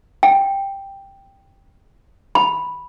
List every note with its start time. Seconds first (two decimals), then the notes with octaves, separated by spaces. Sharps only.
0.23 G5
2.35 B5